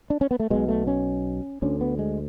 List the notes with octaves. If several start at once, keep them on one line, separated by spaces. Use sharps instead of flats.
D4
C#4
B3
A3
B1 B2 G#3
A3
C#4
D2 D3 C#4
B3
G#3